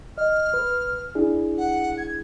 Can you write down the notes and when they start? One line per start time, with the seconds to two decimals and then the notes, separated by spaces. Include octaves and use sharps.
0.18 D#5 F6
0.54 B4
1.15 D4 E4 G#4
1.58 F#5
1.98 G#6